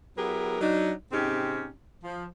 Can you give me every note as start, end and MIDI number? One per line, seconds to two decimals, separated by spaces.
0.17 0.61 54
0.17 0.61 59
0.17 0.61 64
0.17 0.61 67
0.17 0.61 68
0.17 0.61 70
0.61 0.92 54
0.61 0.92 62
0.61 0.92 63
1.12 1.69 44
1.12 1.69 48
1.12 1.69 60
1.12 1.69 61
1.12 1.69 63
1.12 1.69 67
2.04 2.26 53